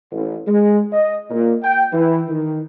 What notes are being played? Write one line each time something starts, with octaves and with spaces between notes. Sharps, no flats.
A1
G#3
D#5
A#2
G5
E3
D#3